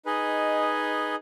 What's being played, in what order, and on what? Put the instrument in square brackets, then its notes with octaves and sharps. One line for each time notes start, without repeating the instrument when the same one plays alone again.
[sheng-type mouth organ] D#4 G#4 B4 D#5 G#5